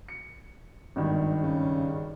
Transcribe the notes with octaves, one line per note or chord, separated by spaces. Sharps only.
C#7
G#1 G2 D#3
C#3